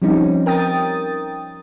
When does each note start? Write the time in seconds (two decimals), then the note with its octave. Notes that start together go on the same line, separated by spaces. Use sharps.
0.02 F3 G3 C4 C#4 D#4
0.46 A#4 G5 D#6 A6